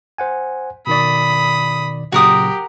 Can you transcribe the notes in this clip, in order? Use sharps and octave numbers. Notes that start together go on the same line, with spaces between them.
C5 F#5 G#5
B2 D#3 D5 B5 D#6
A#2 C#3 F#3 F#4 G4 A#4 D#6